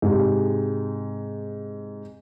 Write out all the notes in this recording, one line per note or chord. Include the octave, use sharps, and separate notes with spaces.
G#2 C3 G#3